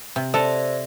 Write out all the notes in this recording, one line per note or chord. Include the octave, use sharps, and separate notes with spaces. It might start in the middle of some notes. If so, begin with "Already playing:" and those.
C3
A4 C5 D5 E5